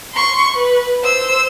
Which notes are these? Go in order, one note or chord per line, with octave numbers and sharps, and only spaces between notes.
C6 C#6
B4
C5 E6